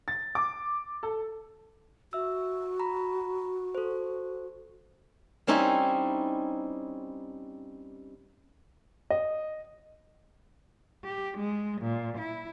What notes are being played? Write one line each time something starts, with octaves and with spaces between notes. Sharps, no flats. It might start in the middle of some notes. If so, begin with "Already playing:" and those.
A6
D6
A4
F#4 E5 E6
A#5 B5
A4 C5
G3 C4 C#4 D#4 E4 G4
D#5
G4
G#3
A#2
E4